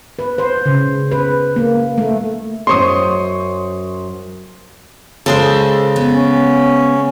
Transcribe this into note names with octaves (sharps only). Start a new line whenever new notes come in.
B4
C5
C#3
B4
A#3
A3
F#2 C5 D#5 C6 C#6 D#6
C#3 G#3 A4 C5 D#5
B3
C#4